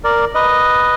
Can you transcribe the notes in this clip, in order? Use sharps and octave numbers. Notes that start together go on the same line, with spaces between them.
A#4 D5
B4 D#5